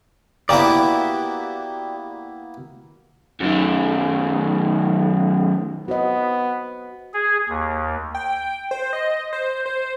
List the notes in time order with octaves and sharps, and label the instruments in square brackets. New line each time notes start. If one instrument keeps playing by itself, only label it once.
[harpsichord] A#3 B3 E4 [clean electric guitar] F#4 G4 D5
[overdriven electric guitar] F#2 D#3
[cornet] B3 [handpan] F#4 C5 D#5
[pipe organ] G#4
D#2
[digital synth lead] G5
C5
D#5
C5
C5